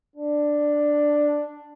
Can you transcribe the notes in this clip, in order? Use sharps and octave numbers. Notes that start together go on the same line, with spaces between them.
D4